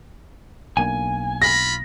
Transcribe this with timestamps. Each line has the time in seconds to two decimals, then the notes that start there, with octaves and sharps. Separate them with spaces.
0.77 B1 A#3 D4 G#5
1.42 F4 B5 A#6